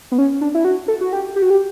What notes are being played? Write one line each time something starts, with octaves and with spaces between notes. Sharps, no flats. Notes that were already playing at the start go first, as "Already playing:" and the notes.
B3
C#4
D4
E4
F#4
A4
F#4
G4
G4
F#4
G4